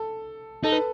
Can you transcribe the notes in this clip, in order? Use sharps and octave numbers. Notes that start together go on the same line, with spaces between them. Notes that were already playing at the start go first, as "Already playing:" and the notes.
Already playing: A4
D#4 A4
B4